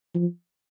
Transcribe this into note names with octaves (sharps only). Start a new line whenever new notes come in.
F3